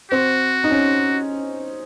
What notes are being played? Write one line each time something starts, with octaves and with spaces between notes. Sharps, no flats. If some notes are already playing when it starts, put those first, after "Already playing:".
C4 F#4
D#4
C#4